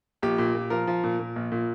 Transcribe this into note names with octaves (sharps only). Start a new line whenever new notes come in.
A#1 G4
A#2
A#2
F3 A#4
F3
A#2
A#2
A#1
A#2